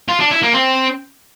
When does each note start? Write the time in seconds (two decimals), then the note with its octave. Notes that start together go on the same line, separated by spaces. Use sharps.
0.09 F4
0.20 D4
0.31 E4
0.43 A#3
0.54 C4